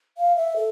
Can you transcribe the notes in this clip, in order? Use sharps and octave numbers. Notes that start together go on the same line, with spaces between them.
F5
E5
A4